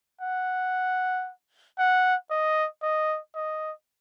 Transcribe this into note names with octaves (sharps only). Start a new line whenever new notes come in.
F#5
F#5
D#5
D#5
D#5